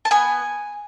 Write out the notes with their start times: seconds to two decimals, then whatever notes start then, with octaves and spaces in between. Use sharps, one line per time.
0.05 A5
0.11 B3 G#5